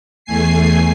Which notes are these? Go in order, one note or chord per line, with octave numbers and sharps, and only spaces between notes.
E2 A3 G#5 C7